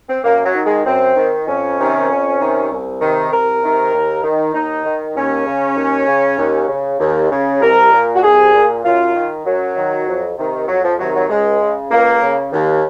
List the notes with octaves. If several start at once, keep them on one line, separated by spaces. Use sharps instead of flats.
C4
F#2 A#3
F#3
D#3
G#3
F#2 C4
D#3
F2 C#4
C3 D#3
F2
C3 D#3
C2
C3 D#3
C2 A#4
C3 D#3
D#2
D#3
D#2 D#4
D#3
D#2 C#4
C#3
D#2
C#3
D#2
C#3
D#2
C#3
C2 A#4
A#2
F#4
C2 G#4
A#2
F#2 F4
D#3
F#2 F#3
D#3
F2
C3 D#3
F2 F#3
F3
C3 D#3 F#3
F#3
C#2 G#3
C#3
C#2 A#3
C#3
D#2